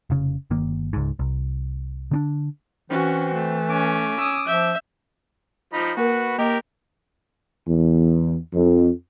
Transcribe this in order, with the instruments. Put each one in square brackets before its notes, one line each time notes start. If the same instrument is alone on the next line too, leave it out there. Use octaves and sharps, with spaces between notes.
[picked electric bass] F1 C#3
G1 D#3 A#3
C#2 G#2
C2
D3 C4 D4
[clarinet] E3 [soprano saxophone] C4 [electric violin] C#4 F#4
[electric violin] A3
[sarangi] C#4 [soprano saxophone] D6
[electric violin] D#6 E6
[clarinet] F3 [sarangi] E5 [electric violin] G6
[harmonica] F3 D#4 B5
[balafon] A#3 A#4 [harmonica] F#4 B4
[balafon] A#3 D#5 [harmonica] G4 A#4
[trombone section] E2
F2